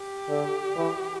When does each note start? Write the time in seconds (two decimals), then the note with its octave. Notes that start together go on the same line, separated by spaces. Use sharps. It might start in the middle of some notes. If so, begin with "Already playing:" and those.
Already playing: G4
0.29 D3
0.76 E3